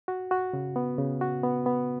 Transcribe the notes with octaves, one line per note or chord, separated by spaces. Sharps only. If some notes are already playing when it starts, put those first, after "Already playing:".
F#4
F#4
C#3
B3
C#3
F#4
B3
B3